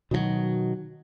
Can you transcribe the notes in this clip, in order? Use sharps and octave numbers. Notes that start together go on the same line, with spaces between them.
B2 D#3 F3 F#3